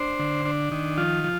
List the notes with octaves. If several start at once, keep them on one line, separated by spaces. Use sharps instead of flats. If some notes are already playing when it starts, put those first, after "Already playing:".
Already playing: D4 C5
D3
D4
D#3
F3 F4
F3